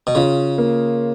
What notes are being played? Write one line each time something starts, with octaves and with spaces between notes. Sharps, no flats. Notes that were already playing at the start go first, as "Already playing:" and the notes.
B2
C#3 F4
A#3